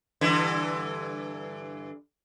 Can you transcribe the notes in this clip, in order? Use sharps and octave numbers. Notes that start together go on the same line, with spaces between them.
G2 D3 E3